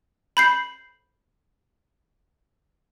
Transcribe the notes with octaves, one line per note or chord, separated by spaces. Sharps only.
B5 G6 C7